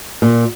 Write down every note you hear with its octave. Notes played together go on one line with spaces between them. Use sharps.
A#2